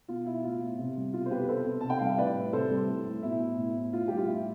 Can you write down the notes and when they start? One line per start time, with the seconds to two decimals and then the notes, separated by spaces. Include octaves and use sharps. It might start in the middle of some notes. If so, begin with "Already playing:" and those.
0.08 B2 F4
0.26 B2 E4
0.44 A2 F4
0.61 A2
0.78 C3
0.96 G3
1.14 B2 F4
1.25 C5
1.31 B2 G4 B4
1.44 B4
1.48 C3 A4 C5
1.66 C3
1.81 C3 A5
1.90 G5
1.99 G3 F5
2.08 E5
2.18 A2 B4 D5
2.36 A2
2.53 C3 A4 C5
2.70 G3
2.88 A2
3.06 A2
3.22 B2 E4
3.40 B2
3.58 A2
3.75 A2
3.93 A2 F4
4.08 G3 G4
4.17 F4
4.27 A2 E4